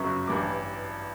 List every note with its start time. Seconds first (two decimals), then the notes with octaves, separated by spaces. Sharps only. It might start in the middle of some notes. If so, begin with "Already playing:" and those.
Already playing: G1 F#2 C#3 F#3 C#6
0.27 A1 G2 E3 D6